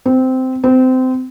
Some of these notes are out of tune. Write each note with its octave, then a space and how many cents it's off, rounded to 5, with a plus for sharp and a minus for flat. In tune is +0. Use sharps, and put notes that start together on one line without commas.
C4 -15
C4 -25